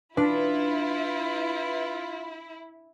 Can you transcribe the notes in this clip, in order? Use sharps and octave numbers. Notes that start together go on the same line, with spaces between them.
D4 E4 F4 B4